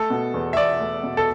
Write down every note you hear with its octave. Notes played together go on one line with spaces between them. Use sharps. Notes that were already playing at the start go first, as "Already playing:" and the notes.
Already playing: A3 A4
B2
E2
E5
E2 D5
A3
B2
A4